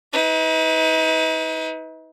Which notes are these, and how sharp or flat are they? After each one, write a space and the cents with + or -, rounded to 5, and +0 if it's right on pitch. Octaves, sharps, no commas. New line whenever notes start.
D#4 +40 B4 +15